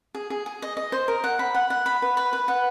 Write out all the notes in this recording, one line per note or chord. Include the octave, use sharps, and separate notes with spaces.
G#4
G#4
G#4
D#5
D#5
C5
A#4
F#5
B5
F#5
F#5
B5
B4
B4
B4
F#5